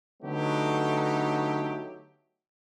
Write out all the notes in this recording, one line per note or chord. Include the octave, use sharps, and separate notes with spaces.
D3 F#3 A3 B3 D#4 G4